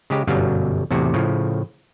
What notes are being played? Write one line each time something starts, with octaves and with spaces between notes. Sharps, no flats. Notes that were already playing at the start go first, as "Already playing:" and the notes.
C#3 G#3 G4
G1 F#2 B2 F#3 G3 F5
E2 A2 C3 F#4
A2 C#3 F3